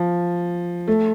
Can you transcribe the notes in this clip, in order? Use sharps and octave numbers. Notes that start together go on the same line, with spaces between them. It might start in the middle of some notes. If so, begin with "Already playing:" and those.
Already playing: F3
A3